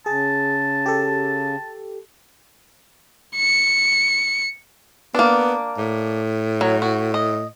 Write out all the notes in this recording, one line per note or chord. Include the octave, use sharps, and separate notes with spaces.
C#3 G#4 A5
G4 A4
C#7
A#3 B3 D4
A2
F#3
F#4
D#5